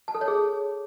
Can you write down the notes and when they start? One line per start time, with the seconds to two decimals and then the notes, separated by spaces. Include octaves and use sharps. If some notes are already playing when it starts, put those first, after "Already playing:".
0.08 A5
0.15 A4
0.21 C#5
0.28 G#4